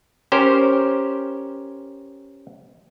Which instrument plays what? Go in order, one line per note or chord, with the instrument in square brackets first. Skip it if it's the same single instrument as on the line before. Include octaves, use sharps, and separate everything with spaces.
[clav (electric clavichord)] C#4 G4 A#4 C5